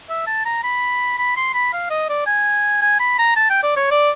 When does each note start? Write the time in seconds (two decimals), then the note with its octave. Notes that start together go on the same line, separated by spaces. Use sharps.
0.10 E5
0.27 A5
0.46 A#5
0.64 B5
1.18 B5
1.37 C6
1.54 B5
1.73 F5
1.90 D#5
2.09 D5
2.27 G#5
2.82 G#5
3.00 B5
3.18 A#5
3.36 A5
3.50 G5
3.63 D5
3.77 C#5
3.91 D5